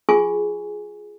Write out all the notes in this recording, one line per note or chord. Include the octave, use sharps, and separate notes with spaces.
F4 G#4 G#5 C#6